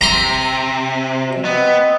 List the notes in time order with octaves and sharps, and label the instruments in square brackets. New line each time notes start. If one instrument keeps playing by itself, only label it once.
[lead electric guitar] C3 [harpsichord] A#5 C6
[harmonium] B2
[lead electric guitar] B3 [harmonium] C4 D#5